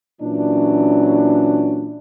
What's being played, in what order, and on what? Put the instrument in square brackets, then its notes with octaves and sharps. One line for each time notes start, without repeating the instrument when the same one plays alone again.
[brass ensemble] A#2 E3 F#3 C#4 D4